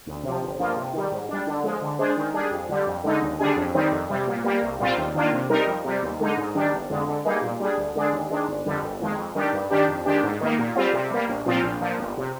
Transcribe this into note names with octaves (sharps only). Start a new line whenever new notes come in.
D2
C3 F3
G1
G2 F3 A#3 F4
C3
D#3 G3
G#2
G3 D4
D3
F3 G#3
D3
G#3 D4 G#4 C5
D#3
G3 D4 G#4
F2
D3 G3
F2
D3 G#3 D#4
D#2
D3 G3 D4 G#4
F2
D#3 G3 C4 D#4
F2
C3 G3
A#2
G3 A#3
C2
A#2 G3 C4 F4
D#2
D#3 A#3 D4 F4
C3
G3 C4 D#4 A#4
F2
C3 G3
D#2
D3 G#3 D#4
G#2
D#3 G3 D4
G1
F2 D3 G#3
D3
G3 A#3 D#4 G#4
A#2
G3 D4 G#4
D2
D3 G#3 D4 G#4
D#2
D#3 G#3 D4
G1
F2 D3 G3
G1
F2 D#3 G#3
F2
D#3 G3 D4 G4
G2
D#3 G3 D4 G4
F2
D#3 G#3 D4 G4
G#2
D#3 A#3 D#4
A#2
G3 C4 F4
C3
G3 A#3
A#1
A#2 F3 C4 F4
A#1
A#2 F3
G1
C3